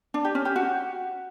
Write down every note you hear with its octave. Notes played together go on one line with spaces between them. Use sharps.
D4
G4
C#4
G4
F#4